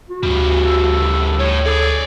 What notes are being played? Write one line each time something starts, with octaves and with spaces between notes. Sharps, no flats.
F#4
D2 C#3 G3
A4
A2 C#5
G#4 A4 C#5 D5